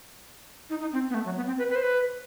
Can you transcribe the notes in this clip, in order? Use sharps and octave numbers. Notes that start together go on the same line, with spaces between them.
D#4
D#4
C4
B3
A3
F#3
B3
C4
B4
B4
C5
B4